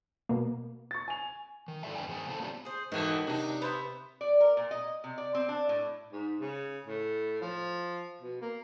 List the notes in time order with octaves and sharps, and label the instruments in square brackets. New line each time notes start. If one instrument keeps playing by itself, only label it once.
[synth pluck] B2 A#3
[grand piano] C#6 A6
G#5 F7
[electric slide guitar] D#3
G#2 E4 A4 D5 E5 G#5
F2 B3 D4 F5 G5 G#5
G#2 D#3 G#4 C5 G#5
C3 B3 E4 A4 C5 A5
A#3 B3 C#4 D4 F4 G4
[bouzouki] G#4 C5
[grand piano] G#2 [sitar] B2 E3 A4 [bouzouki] D#3 F#3
[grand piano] C3 [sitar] D4 D#4
[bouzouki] B3 C5 E5
[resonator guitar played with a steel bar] D5
A#4
A#2
D#5
C3
D5
C4
D4
A2
[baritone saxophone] G#2
C#3
A2
F3
B2
A#3